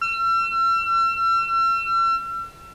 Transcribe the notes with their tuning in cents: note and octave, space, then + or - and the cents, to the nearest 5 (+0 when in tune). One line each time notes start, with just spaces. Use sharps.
E6 +40